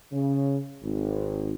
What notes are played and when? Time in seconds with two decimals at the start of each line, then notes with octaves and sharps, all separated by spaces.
0.12 C#3
0.83 G#1